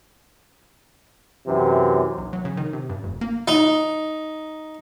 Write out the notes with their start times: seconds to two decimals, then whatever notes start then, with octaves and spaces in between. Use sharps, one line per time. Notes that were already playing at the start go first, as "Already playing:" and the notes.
1.47 F#2 C3 E3
2.18 B1
2.33 F#3
2.45 C#3
2.57 D#3
2.73 C3
2.90 G2
3.04 F1
3.21 A#3
3.48 D#4